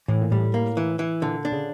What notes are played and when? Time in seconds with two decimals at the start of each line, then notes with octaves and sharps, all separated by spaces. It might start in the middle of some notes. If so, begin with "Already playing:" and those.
0.08 A2 E3
0.21 A#2
0.31 A2 G3
0.54 A#3
0.77 E3
0.99 E3
1.22 A#2 D3
1.45 D4
1.52 C#3